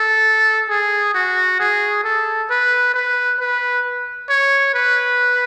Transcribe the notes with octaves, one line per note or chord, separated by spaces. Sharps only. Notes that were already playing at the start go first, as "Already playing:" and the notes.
Already playing: A4
G#4
F#4
G#4
A4
B4
B4
B4
C#5
B4